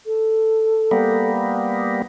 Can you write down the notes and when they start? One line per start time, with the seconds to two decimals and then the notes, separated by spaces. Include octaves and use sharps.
0.06 A4
0.91 G3 A#3 B3